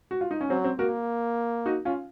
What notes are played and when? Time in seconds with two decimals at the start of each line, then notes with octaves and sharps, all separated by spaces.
0.11 F#4
0.21 F4
0.31 D#4
0.41 C#4
0.50 F#3 C4
0.64 C4
0.79 A#3 F#4 A#4
1.66 D#4 F#4
1.85 C#4 F4